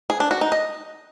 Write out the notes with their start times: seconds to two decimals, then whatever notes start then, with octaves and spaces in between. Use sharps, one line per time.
0.10 G#4
0.20 D4
0.31 F#4
0.41 D#4
0.52 D#5